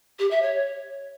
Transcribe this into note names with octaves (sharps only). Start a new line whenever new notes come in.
G4
E5
C#5